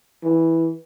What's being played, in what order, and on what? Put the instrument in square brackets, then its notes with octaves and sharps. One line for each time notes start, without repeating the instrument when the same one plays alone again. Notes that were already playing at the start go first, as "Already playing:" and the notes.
[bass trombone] E3